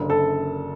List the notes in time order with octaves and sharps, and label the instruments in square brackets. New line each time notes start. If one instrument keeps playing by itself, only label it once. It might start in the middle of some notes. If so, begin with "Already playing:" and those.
Already playing: [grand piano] F#1 F#2 D3
[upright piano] A4